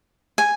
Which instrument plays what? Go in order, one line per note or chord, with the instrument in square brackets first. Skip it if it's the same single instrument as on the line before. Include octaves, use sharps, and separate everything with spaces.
[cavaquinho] G#5